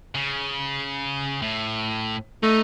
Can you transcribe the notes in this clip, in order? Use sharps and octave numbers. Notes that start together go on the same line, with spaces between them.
C#3
A2
A3 D#4 D#5